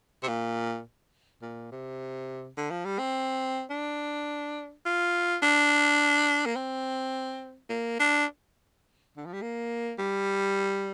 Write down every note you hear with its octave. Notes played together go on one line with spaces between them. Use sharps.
C3
A#2
A#2
C3
D3
F3
G3
C4
D4
F4
D4
A#3
C4
A#3
D4
D3
F3
G3
A#3
G3